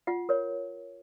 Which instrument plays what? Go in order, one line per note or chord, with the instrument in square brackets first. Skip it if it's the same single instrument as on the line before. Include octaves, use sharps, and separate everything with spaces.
[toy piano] F4 F#5
A#4 C#5